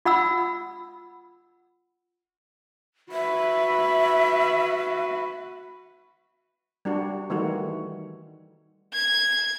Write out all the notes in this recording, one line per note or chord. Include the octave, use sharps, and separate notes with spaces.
F4 F#5 B5 E6
F#4 B4 E5
G3 D4 F#4
D#3 E3 G3 A3 F#4
G#6